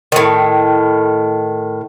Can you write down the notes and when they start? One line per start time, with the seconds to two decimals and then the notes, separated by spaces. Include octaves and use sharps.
0.12 A2 D#3